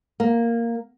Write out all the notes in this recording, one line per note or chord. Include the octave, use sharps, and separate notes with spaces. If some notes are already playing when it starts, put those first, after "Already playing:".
A#3